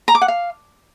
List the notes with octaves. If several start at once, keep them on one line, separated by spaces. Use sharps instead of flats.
A#5
D6
F#5
F5